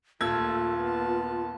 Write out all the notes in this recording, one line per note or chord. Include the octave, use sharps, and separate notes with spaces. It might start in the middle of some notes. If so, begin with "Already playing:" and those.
D#1 A3 A#3 F4 A5 E6 G#6
B3 A5